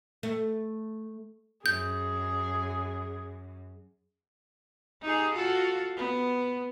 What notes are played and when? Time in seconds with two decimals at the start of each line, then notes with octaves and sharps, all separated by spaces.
0.23 A3
1.66 F#2 G#4 G6
5.02 D#4 G4 G#4
5.33 F4 F#4 A4
5.97 B3